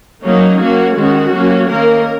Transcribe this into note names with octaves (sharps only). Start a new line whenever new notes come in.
F#3 A#3 C#4 D#4
F#3 A#3 C#4 F#4
D#3 G#3 C#4 F#4
F#3 A#3 C#4
D#3 A#3 C#4 A#4